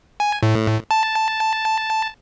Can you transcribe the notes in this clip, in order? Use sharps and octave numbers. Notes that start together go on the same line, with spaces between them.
G#5
A2
A5